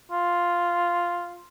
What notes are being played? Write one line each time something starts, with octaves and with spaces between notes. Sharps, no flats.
F4